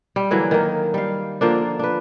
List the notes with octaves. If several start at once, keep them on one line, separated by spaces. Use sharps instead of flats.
G3
D3 E3 F#3 A#3
D#3 A#3
G3 F5
D3 F3 A#3 D4
D4 B4